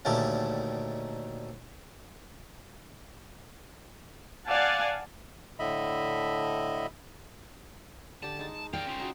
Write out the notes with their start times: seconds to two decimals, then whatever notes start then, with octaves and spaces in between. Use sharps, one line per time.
0.05 D2 A#2 D#3 G3 A3 C#4
4.48 D5 F5 F#5 G#5 A5
5.59 A2 D3 D#5 E5 B5
8.23 D3 G4 D5 A5
8.39 G#3 D#4
8.73 D5 F5 G5
8.87 C#4 F4
9.00 D#4 F#4